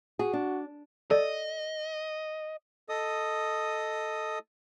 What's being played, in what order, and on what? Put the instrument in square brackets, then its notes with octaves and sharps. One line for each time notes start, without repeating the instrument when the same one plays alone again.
[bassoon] F#4 [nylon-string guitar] G#4
[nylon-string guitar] D4
[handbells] A4 D5 [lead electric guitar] D#5
[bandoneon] A4 D#5 D#6